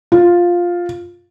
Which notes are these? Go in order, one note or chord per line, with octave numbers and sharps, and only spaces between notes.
F4